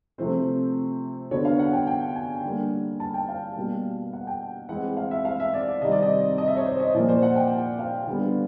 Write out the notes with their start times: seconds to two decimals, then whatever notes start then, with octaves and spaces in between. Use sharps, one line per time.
0.18 C3 F3 A3 C4 C5
1.31 D3 F#3 B3 C#5
1.45 F5
1.59 F#5
1.73 G5
1.87 G5
2.16 G#5
2.43 D3 G3 A#3
3.00 A5
3.14 G5
3.28 F5
3.56 B2 G3 A#3
4.13 F#5
4.27 G5
4.69 E3 G#3 C4 F#5
4.97 F5
5.11 E5
5.25 F5
5.40 E5
5.54 D5
5.82 C3 D#3 G3 C4 D#5
5.92 D5
6.02 D#5
6.38 D#5
6.47 E5
6.57 C#5
6.66 C5
6.80 D#5
6.95 A#2 F3 A#3 D5
7.09 C5
7.22 F#5
7.36 G5
7.79 F5
8.07 D3 G3 B3